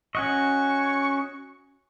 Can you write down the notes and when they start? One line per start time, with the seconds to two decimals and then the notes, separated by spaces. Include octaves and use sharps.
0.15 C#4 F#4 D#5 C#6